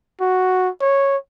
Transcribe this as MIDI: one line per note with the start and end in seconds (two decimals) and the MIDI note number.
0.21 0.69 66
0.81 1.17 73